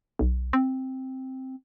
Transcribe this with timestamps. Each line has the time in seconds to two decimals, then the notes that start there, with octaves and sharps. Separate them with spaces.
0.19 B1
0.53 C4